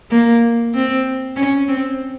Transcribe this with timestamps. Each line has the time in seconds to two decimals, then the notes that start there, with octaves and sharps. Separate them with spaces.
0.11 A#3
0.74 C4
1.36 C#4
1.68 C4